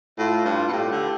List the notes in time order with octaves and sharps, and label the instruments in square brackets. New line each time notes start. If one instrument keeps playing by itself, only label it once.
[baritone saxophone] A2 [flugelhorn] F4
[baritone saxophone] G2
B2
[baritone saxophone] A2 [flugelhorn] G4
[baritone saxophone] D3